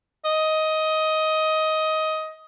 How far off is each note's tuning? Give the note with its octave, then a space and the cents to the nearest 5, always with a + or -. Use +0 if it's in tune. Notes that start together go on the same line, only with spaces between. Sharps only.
D#5 +15